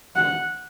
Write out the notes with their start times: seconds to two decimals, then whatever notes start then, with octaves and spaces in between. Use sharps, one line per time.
0.16 F#5